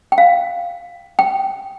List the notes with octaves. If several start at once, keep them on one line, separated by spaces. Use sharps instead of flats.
G5
F5
G5